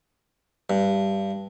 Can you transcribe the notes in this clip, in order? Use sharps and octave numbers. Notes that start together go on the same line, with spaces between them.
G2